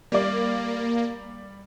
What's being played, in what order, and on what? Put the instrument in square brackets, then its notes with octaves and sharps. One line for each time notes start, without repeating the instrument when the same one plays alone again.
[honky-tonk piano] G3 D5 [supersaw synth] A#3